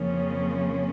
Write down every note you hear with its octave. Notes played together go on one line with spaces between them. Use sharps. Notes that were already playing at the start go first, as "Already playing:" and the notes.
Already playing: F2 C#3 F3 A#3 C#4